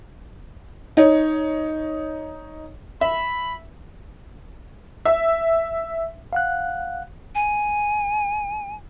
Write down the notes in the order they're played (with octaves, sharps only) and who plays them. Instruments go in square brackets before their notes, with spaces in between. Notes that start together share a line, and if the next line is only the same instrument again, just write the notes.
[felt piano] D#4 C#5
[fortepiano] E5 [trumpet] B5
[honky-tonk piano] E5
[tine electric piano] F5 F#5 F#6
[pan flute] G#5